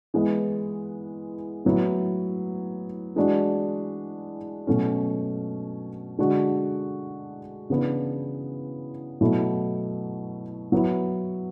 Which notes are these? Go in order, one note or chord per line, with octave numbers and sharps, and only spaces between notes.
E3 G#3 B3
A2 F#3 B3 E4
E3 G#3 D4 F#4
B2 F#3 A3 C#4
D3 G#3 D4 F#4
C#3 E3 B3 D4
B2 F#3 A3 E4
F#3 B3 E4